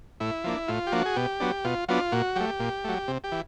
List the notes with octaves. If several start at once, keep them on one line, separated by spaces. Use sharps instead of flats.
A2 E4
F3 A#3 D4
A2 F4
G4
F3 A#3 D4 F#4
G#4
B2 G4
F#3 B3 D4
B2 F4
F#3 B3 D4 F4
A#2 F#4
F#3 A3 G4
A#2
F#3 A3
C3
G4
E3